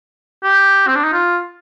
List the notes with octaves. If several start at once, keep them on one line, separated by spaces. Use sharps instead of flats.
G4
C4
D4
D#4
F4